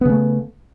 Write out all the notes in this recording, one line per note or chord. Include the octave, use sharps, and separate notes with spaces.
C#3 A3 B3